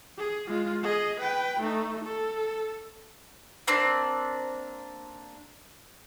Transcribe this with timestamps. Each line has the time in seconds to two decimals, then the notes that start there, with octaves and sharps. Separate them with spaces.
0.18 G#4
0.48 G#3 F4
0.83 G#4 D#5
1.20 B4 G5
1.60 A3 D#4
2.04 A4
3.67 A#3 C4 D4